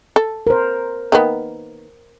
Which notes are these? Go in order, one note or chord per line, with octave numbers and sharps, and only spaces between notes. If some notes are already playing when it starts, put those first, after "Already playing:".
A4
A#4 C5
D#3 A#3 B3